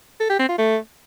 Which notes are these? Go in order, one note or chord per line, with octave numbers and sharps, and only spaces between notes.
A4
G4
C4
F4
A3